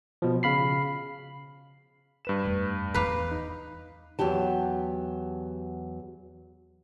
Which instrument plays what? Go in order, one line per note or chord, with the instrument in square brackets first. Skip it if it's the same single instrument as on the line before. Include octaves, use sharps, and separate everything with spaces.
[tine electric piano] B2 F3
C#3 F5 B5 C7
[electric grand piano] G2 B4 E7
[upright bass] F2 A3
[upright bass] E2 E3 [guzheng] B4 F5 [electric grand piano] A#5 D6
[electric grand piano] D#4
[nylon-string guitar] E2 F#3 F#4 G4 A5